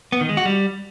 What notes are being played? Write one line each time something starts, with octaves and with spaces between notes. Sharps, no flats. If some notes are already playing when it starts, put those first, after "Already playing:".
B3
D#3
G#3
F#4
G3